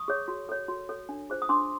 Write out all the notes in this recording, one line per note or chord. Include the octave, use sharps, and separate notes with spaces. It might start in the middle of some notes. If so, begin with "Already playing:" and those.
Already playing: C#6 D#6
G#4 C#5
F#4
A4 C#5
F#4
A4 C#5
D4
F4 G#4 C5
D#6
D4 C6 D6